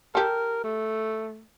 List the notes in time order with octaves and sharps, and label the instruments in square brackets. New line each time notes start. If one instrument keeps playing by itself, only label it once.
[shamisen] G4 A4 [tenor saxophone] A#4
[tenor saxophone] A3